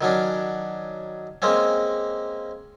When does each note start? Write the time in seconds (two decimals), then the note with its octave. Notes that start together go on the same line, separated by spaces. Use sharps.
0.01 D#3 F#3 C#4 D4
1.42 G#3 A#3 C4 C#4